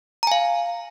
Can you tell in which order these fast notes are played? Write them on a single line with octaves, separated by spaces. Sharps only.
A#5 G#5 F5